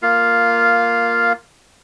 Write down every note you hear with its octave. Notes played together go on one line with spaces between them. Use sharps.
A#3 F4 F5